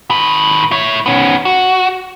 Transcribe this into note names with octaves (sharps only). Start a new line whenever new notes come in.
D#3 B4
E4 C#5
B3 C#4
F#4